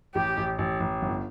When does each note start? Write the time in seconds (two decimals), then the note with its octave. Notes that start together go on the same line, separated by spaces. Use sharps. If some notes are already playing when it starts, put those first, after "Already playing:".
0.15 A1 G4
0.37 A1
0.58 A1
0.80 A1
1.02 G1